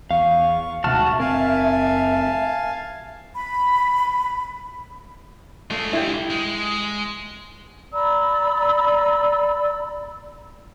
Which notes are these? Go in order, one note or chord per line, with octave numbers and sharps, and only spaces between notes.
E2 F5 C#6
D1 D2 G#2 B2 F#4 E5 A5 F6
F#1 C4 A#4 F5 G#5 A5
B5
G#3 A3 F4
E4 G4
G#3
D5 A#5 B5 E6